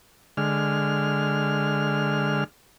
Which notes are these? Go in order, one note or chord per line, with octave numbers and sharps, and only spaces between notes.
D3 G#3 F6